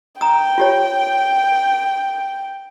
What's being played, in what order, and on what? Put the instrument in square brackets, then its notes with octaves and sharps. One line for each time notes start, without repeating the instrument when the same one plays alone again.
[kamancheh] G5 [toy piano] A#5 D#6
[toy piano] F4 G4 C#5